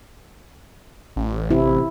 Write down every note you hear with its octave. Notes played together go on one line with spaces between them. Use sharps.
A1
C3 E4